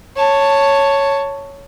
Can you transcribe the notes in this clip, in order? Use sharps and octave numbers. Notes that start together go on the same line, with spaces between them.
C#5 A5